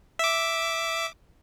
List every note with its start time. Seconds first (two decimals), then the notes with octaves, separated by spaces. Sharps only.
0.19 E5 D6